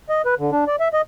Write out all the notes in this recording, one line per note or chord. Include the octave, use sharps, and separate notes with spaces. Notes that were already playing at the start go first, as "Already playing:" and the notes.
D#5
B4
D3
D4
D5
E5
D#5